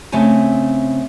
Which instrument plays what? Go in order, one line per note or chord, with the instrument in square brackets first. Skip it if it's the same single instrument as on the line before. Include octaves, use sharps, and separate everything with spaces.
[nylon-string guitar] C#3 A3 C4 C#5 G#5